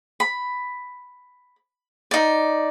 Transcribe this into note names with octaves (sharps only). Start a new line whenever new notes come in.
B5
D#4 D5